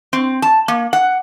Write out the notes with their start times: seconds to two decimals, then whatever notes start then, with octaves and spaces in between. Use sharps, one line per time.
0.13 C4
0.42 A5
0.68 A#3
0.93 F#5